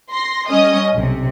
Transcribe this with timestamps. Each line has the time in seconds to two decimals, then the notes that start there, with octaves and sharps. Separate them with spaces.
0.11 C6 A#6
0.48 G3 C#4 D#5 D#6
0.93 B1 C3